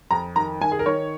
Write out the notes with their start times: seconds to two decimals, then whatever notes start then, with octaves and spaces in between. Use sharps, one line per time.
0.11 F2 A#5
0.36 D#3 A#5
0.61 D#3 G#5
0.72 G#4
0.79 A#4
0.86 D#3 C#5